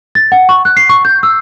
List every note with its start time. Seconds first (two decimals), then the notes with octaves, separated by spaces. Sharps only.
0.15 A6
0.32 F#5
0.49 C#6
0.65 F#6
0.77 C7
0.89 C#6
1.05 G6
1.23 E6